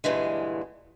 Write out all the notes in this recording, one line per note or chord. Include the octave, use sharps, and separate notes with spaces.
G2 A#2 D3 E3 G#3